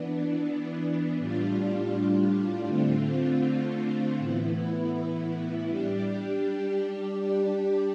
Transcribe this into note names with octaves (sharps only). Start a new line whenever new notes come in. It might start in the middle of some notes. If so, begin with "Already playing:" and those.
Already playing: E3 B3 D4
A2 G3 D4 F4
D3 A3 C4 F4
A2 E3 B3 E4
G3 D4 G4
G3 D4 G4